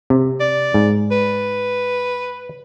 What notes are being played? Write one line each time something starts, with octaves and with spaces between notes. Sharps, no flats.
C3
D5
G#2
B4